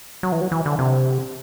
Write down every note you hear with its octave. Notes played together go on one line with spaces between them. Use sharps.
F#3
E3
F#3
E3
D3
C3